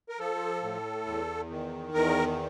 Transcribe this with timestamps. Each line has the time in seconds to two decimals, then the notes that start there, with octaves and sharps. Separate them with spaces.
0.09 A#4
0.19 F3 A4
0.63 A2
1.06 E2
1.50 D#3
1.94 E2 A#4